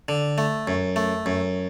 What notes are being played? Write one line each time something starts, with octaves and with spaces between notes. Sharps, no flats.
D3
A3
F#2
A3
F#2